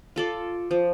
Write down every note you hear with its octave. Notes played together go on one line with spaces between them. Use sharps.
F4 A4 D5
F3